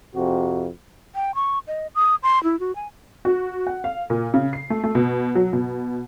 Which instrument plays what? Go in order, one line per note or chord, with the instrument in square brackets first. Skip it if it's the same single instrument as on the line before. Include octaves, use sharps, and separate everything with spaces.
[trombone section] F2 C3 F#4
[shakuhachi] G5
C#6
D#5
D#6
C6
E4
F#4
G#5
[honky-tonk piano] F#4
F#5
F5
A#2
C#3
C7
A3
A3
B2
F#3
B2